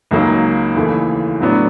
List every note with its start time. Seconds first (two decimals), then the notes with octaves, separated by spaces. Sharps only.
0.11 C#2 C#3 F#3 A#3 D#4
0.76 D#2 C#3 E3 A3
1.41 A2 F#3 B3 D4